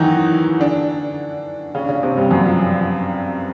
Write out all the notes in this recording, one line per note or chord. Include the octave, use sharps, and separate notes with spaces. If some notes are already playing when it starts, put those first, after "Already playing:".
Already playing: D#3 E3 F#3 D#4 E4 F#4
D3 D4
C#3 C#4
D4
C#3 C#4
C3 C4
G2 G3
F#2 F#3
F3